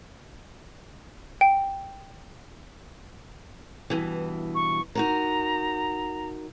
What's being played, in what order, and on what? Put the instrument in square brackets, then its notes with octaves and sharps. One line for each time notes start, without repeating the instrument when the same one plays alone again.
[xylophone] G5
[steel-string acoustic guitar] G2 B2 E3
[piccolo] C#6
[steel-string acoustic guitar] D#4 F#4 A#4 [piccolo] A#5